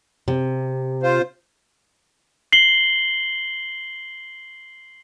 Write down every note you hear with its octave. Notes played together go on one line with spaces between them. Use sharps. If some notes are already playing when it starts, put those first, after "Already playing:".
C3
F4 C5
C7 F#7 G7